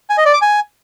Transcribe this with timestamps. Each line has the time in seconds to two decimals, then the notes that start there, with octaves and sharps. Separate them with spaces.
0.10 G#5
0.18 D#5
0.26 D5
0.34 D6
0.42 G#5